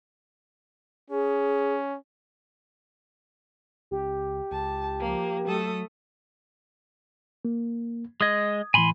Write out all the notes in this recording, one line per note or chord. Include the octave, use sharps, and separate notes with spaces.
C#4 G#4
C#2 G4
C#2 A5
F3 A#3
F#3 A3 A4 D#6
A#3
G#3 D#5 D#6 G#6
A2 E3 G#5 B5 C6